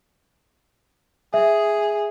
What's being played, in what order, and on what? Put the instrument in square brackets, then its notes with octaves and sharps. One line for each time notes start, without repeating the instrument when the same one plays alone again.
[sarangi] G#4 [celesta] E5